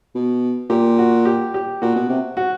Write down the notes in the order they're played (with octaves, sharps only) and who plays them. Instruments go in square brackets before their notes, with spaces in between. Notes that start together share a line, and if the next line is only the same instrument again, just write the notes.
[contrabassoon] B2
[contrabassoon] A#2 [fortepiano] G4
[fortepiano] F#4
G4
G4
[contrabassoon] A#2 [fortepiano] F#4
[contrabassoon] B2
C3
[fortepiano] F#4